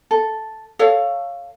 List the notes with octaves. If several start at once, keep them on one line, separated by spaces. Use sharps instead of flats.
A4
A4 C#5 F5